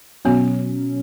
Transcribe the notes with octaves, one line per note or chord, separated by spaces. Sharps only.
B2 F#3 B3 C#4